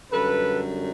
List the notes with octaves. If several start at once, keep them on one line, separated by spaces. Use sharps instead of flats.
F#2 D3 G3 A4 B4